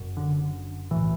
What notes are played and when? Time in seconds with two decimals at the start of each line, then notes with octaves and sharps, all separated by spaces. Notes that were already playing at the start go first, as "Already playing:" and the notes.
Already playing: F#1 F#2
0.17 D3
0.91 B1 A2 E3